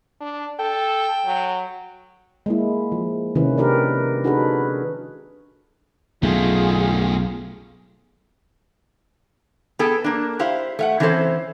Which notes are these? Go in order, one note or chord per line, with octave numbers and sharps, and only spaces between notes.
D4
A4 G5
F#3
G#3 A#3 E4
F3
C3 D#3 C#4 E4 B4
D4 G4 A#4 B4 D5
D4 D#4 F#4 G#4 A4 B4
B1 F#2 B2 A3 F4 G#4
B3 G#4 A4 G5
A#3 D4
E4 G4 C5 F5
A3 F5 F#5
E3 C4 C#4 E4 A4 C5